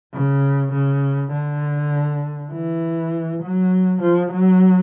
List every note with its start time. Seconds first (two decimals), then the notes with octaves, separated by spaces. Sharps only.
0.14 C#3
0.73 C#3
1.33 D3
2.52 E3
3.43 F#3
4.02 F3
4.32 F#3